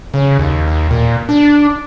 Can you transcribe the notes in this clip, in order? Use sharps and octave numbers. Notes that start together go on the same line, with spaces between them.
C#3
D#2
D#2
A#2
D4